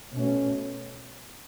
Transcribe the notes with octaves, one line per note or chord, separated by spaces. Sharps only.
B2 A3 C#4